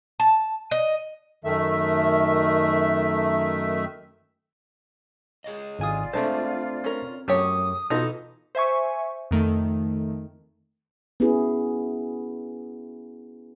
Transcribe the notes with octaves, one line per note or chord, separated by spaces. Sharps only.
A5
D#5
F#2 D#3 A3 E5
G#4 C#5 D#5
G#1 F4 D5 G#5 D#6
G#3 A3 C4 D4 A4 C5
C#4 A#4
F#2 A3 G4 C#5 D#6
B2 E3 D#4 F4 A4 A#6
C5 E5 G#5 C#6
F2 D#3 A3
B3 C#4 E4 F#4 G#4 B4